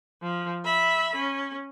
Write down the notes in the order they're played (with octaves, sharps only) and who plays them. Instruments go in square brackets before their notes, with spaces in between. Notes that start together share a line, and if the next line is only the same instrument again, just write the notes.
[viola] F3
E5 B5
C#4